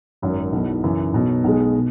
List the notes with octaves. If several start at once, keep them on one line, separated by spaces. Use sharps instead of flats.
G#1 F#2 F#3
B1 B2 F#3 E4
F#2 C#3 E3
B1 B2 F#3
B1 B2 G#3
B2